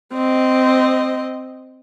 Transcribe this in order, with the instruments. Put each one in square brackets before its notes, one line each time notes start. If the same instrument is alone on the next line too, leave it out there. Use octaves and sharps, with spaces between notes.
[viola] C4 D#5